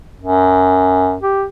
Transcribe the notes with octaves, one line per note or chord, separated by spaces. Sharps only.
F#2
G4